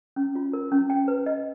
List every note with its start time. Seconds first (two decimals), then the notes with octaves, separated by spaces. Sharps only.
0.16 C#4
0.35 F4
0.53 A#4
0.72 C#4
0.90 G5
1.08 B4
1.26 D#5